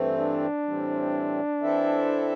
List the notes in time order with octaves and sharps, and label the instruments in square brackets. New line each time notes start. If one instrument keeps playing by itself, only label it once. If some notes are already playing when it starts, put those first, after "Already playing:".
Already playing: [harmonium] G2 E3 A3 C4
[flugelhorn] D4
[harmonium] A2 E3 G3 C4
E3 C4 E4 A4 E5